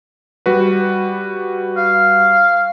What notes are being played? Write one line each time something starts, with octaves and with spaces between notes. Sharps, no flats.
G3 F#4 B4
F5